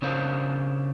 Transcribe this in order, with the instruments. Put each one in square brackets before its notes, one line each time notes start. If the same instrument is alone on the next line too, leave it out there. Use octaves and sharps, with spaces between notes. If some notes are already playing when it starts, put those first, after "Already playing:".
[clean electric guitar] C#3 C#4 D4 A#4 C5 F5